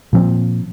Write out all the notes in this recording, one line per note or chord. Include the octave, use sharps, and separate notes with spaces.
A#2 F3 C4